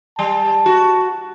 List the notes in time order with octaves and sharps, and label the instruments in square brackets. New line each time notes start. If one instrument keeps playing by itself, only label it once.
[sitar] G3 [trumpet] A5
[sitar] F#4